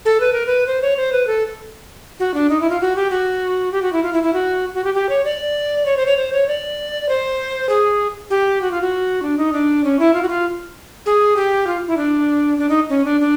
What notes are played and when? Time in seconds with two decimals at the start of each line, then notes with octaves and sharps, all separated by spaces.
0.05 A4
0.20 B4
0.33 A#4
0.46 B4
0.67 C5
0.82 C#5
0.97 C5
1.13 B4
1.27 A4
2.20 F#4
2.34 D4
2.50 D#4
2.61 E4
2.70 F4
2.81 F#4
2.96 G4
3.11 F#4
3.72 G4
3.82 F#4
3.93 E4
4.03 F4
4.13 E4
4.23 E4
4.33 F#4
4.74 F#4
4.84 G4
4.94 G4
5.09 C#5
5.25 D5
5.86 C#5
5.97 C5
6.06 C#5
6.17 C5
6.33 C#5
6.48 D5
7.09 C5
7.69 G#4
8.30 G4
8.61 F#4
8.71 F4
8.81 F#4
9.22 D4
9.38 D#4
9.53 D4
9.84 C#4
9.99 E4
10.14 F4
10.22 F#4
10.29 F4
11.06 G#4
11.36 G4
11.67 F4
11.87 E4
11.97 D4
12.58 D4
12.69 D#4
12.89 C#4
13.05 D4
13.20 D4